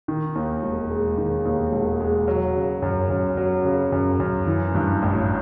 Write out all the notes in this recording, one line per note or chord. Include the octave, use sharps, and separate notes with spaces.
D#3
D#2
E1
G#3
D#3
D#2
E1
G#3
F#3
C#3
F#2
F#2
F#3
C#3
F#2
F#2
E3
G2
A1